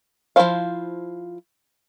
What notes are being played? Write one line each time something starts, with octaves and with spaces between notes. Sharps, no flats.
F3 F#3 E4 C5 F5